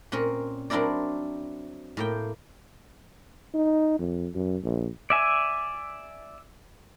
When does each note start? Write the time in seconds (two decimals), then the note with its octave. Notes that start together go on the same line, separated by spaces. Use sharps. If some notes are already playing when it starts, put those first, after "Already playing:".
0.12 A#2 C4 C#4 A#4
0.70 F#3 C4 D4 E4 A#4 D5
1.97 A2 A#3 G5
3.54 D#4
3.99 F2
4.34 F#2
4.63 A#1
5.10 D5 E5 G#5